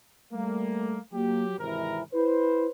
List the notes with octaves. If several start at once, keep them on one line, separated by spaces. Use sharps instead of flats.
G3 A3 A#3
F#3 A#3 G4
G#1 C3 E3 A#4
E4 B4 C5